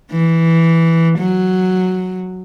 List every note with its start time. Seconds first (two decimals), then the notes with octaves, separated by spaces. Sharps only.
0.12 E3
1.19 F#3